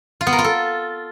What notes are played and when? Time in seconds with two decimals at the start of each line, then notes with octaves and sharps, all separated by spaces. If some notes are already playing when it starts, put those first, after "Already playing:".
0.21 F4
0.27 B3
0.33 A#4
0.38 F4
0.44 A4